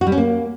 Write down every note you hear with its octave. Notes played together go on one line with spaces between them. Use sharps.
F#4
G3
C#4
A#3